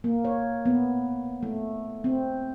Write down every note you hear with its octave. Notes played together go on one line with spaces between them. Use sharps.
A#3
C#5
B3
A3
C4